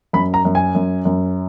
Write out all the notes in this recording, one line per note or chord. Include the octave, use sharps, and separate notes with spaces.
F#2 B5
A#5
F#2
G#5
F#2
F#2